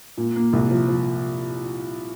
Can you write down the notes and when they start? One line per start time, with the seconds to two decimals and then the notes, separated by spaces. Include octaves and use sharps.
0.17 A#2
0.36 A#3
0.53 C2
0.71 F3
0.88 F3